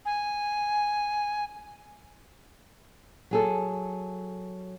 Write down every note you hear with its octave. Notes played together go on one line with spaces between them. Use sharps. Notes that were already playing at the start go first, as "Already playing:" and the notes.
G#5
F#3 G#4 A4